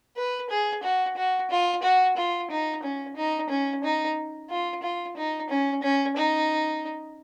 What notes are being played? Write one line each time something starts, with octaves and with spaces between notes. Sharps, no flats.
B4
G#4
F#4
F#4
F4
F#4
F4
D#4
C#4
D#4
C#4
D#4
F4
F4
D#4
C#4
C#4
D#4